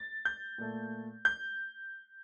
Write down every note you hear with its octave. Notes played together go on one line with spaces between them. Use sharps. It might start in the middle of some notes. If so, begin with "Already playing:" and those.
Already playing: A6
G6
A#2 A3
G6